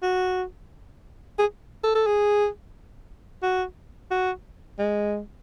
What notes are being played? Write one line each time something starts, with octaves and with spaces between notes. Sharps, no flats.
F#4
G#4
A4
A4
G#4
F#4
F#4
G#3